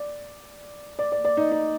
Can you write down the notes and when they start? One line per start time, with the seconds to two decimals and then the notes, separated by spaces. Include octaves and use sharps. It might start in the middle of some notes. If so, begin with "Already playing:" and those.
Already playing: D5
0.99 D5
1.12 D5
1.25 D5
1.37 D#4
1.52 D#4